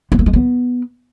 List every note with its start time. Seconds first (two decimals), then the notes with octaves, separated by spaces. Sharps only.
0.12 B3
0.19 A#3
0.26 G#3
0.33 B3